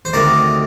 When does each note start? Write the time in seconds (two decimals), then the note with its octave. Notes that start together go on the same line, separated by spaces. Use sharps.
0.05 C5
0.13 D2 C3 D#3 A#4 D5